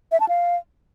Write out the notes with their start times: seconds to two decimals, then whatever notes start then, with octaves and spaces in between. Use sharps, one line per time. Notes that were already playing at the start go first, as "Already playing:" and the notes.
0.12 E5
0.20 A5
0.29 F5